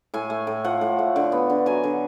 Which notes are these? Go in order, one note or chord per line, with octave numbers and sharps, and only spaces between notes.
A2 G#5
A3
A2
F3 F#5
A2
A3
D3
B3
D3
F#3 G#5
D3